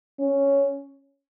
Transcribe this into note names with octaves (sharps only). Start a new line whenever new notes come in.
C#4